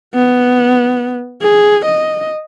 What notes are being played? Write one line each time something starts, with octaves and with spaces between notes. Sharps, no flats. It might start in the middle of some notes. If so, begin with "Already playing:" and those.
B3
G#4
D#5